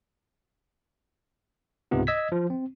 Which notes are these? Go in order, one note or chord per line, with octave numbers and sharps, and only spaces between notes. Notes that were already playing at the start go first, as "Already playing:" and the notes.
C#2 G#2 C3 B3 F4
D#5 E6 G#6 B6
F3
C4